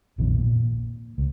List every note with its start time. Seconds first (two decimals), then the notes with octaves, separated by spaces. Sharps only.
0.18 A#1 F2 B2 D#3
0.39 A#2
1.18 C#2